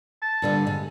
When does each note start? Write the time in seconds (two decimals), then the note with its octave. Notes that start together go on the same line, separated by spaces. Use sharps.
0.22 A5
0.42 G2 D3 G3
0.67 G#3